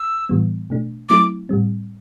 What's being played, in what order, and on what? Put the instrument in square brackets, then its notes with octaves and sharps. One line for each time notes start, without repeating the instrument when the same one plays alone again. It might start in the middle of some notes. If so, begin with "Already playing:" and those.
Already playing: [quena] E6
[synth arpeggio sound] A2 E3 G3 B3
B2 A3 D4
[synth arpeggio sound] F#3 A3 C4 E4 [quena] D6
[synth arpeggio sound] A2 G3 C4